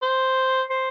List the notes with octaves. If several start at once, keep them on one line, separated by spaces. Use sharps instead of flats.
C5
C5